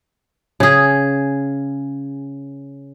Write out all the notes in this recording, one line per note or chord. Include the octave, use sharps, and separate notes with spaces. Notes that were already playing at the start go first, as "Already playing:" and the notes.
C#3 G#4